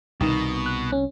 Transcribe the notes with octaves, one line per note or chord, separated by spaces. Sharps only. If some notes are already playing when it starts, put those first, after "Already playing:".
C2 B2 D#3
F#6
C#4